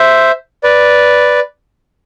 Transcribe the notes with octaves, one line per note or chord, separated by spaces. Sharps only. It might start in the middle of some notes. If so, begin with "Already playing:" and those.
Already playing: C5 E5
B4 D5